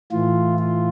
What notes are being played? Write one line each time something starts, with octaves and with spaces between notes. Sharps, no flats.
A2 E3 F4
F4